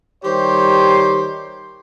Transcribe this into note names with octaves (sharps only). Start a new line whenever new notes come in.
D#3 G3 G4 C5 C#5 C6